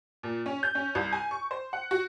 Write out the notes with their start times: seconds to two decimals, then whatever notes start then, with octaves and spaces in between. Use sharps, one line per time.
0.23 A#2
0.46 C#4
0.63 G6
0.75 C#4
0.95 C2
1.13 G#5
1.31 C#6
1.51 C5
1.73 F#5
1.91 F#4